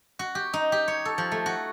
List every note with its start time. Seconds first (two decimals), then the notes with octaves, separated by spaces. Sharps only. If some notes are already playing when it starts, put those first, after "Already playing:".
0.19 F#4
0.35 G4
0.53 D#4
0.72 G4
0.88 C#5
1.05 A4
1.18 F3
1.32 A3
1.46 F#4